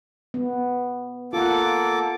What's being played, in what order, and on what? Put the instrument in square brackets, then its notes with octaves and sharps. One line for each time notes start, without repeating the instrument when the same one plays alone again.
[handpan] B3
[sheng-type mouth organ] A#3 A4 D6 [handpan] F4 F#5